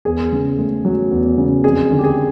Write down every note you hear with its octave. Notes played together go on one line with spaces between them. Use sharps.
E2 G#4
C#3
A3
F#3
E2
C#3
F2 G#4
D3
G4
G#4